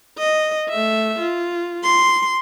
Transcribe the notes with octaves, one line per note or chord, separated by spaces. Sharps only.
D#5
A3 E5
F4
C6